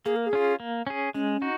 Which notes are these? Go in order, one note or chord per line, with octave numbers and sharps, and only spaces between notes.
A#3 G#4
A#4
G#4
C#4 F4
A#3
C#4 G#4
G#3 C#4
D#4 F#4